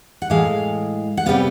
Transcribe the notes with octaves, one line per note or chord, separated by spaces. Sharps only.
F#5
A2 E3 G#3 F5
F#5
C3 D#3 G3 B3 F5